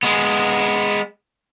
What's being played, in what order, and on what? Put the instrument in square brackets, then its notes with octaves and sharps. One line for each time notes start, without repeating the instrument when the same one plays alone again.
[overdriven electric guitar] G#3 B3